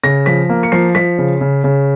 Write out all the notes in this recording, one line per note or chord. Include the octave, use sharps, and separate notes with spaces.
C#3 A#6
F3 B6
A#3
C#7
F3 C7
F3 B6
C#3
C#3
C#3